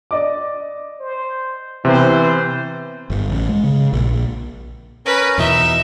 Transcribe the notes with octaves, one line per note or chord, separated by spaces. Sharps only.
D5 D#5 D6
C5
C3 E3 B3 C5
G1
A1
G#3
C#3
A#1
C#4 A#4 B4
E2 B2 E3 D#4 E5